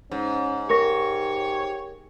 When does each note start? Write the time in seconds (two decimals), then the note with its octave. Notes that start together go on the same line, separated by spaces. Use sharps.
0.11 G#2 C#4
0.70 G4 A#4 C#5 C#6 A#6